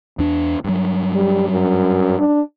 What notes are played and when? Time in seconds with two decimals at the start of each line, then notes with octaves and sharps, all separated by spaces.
0.19 E2 D4
0.64 G2 F#3
1.15 G3
1.49 F#2
2.19 D4